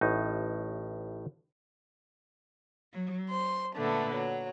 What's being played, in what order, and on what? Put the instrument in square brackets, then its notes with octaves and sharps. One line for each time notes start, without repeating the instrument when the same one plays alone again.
[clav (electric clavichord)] A1 A2 D#4
[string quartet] F#3
C5 C6
A#2 D3 A3 B3
F#3